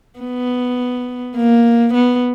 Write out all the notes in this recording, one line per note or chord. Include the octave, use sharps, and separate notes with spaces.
B3
A#3
B3